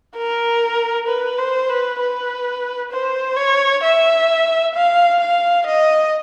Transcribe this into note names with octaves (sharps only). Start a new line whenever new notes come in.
A#4
B4
C5
B4
B4
C5
C#5
E5
F5
F5
D#5